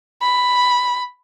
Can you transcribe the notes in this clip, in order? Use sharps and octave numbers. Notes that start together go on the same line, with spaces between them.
B5